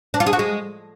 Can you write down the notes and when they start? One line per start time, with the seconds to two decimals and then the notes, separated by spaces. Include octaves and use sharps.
0.14 D4
0.20 F4
0.26 G#4
0.33 F#4
0.39 G#3